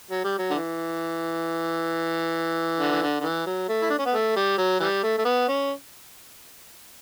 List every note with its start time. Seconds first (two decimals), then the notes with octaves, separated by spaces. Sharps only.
0.10 F#3
0.24 G3
0.38 F#3
0.50 D3
0.55 E3
2.79 D3
2.91 E3
3.02 D3
3.20 D3
3.23 E3
3.46 F#3
3.68 A3
3.82 E4
3.90 D4
3.98 C#4
4.06 B3
4.13 A3
4.36 G3
4.58 F#3
4.80 E3 G3
5.03 A3
5.18 A3
5.25 B3
5.48 C#4